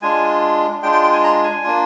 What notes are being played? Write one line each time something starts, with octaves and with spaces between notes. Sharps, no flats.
G#3 D4 F4 G#5
G#3 D4 F4 G5
G5
G5
G#5
A#5
G#5
A#3 D4 F4